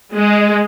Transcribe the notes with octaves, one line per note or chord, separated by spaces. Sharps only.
G#3